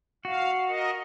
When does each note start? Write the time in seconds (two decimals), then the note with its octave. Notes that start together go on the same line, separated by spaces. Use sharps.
0.25 F#4 F5
0.68 A#4 D#5